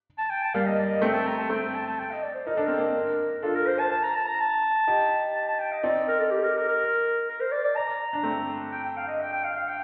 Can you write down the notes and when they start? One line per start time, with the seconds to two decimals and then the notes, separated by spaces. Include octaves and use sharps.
0.18 A5
0.30 G5
0.42 A5
0.54 G3 A#3 F5
0.66 D#5
0.79 D5
0.89 D#5
1.02 A3 C4 G5
1.14 A5
1.27 A#5
1.38 A5
1.50 A3 C4 G5
1.63 G5
1.74 A5
1.86 A5
1.99 G5
2.11 D#5
2.23 D5
2.34 C5
2.47 D#4 A#4
2.55 D4 A4
2.65 C4 A#4
2.78 A#3 D4
3.42 D4 F4 A4
3.54 A#4
3.67 C5
3.79 A5
3.91 A5
4.03 A#5
4.15 A5
4.27 A#5
4.40 A5
4.87 D#4 G4
5.35 A5
5.48 A5
5.59 G5
5.72 D#5
5.83 C4 D#4 D5
6.08 A#4
6.19 A4
6.31 G4
6.43 A#4
6.56 A#4
6.68 A#4
7.28 A#4
7.40 C5
7.52 D5
7.64 D5
7.76 A#5
8.13 D4
8.23 A3 C4
8.72 G5
8.84 G5
8.97 F5
9.08 D#5
9.21 G5
9.33 G5
9.44 F5
9.56 F5
9.68 G5